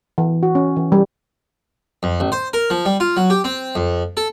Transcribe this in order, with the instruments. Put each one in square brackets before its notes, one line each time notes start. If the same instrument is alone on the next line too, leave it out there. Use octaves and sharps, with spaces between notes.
[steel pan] E3
F#4
C#4
E3
G3
[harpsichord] F2
A1
C5
A#4
F3
G3
F4
F#3
G4
C4
F2
A4